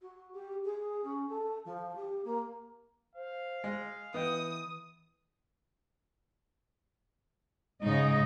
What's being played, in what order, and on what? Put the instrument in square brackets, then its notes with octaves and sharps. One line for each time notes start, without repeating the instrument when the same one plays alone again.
[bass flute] F#4
G4
G#4
C#4
A4
F3
G4
A#3
[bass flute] C5 [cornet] F5
[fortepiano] G#3
[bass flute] E3 [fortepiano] B3 D#5 G5 [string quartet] D#6
[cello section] G#2 D#5 [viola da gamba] C#3 D#4